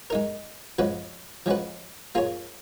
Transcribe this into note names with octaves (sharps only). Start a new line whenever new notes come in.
G#3 D#4 A#4
F3 G#3 C#4 F#4 B4
F3 G#3 C#4 F#4 B4
A#3 F4 G#4 C#5